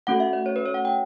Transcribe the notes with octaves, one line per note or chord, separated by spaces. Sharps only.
A3 C#4 F#4 A4 F#5
E5
D5
C#5
B4
C#5
F#5
G5